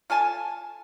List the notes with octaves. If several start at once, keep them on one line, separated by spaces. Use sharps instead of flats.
F4 A4 G#5 A5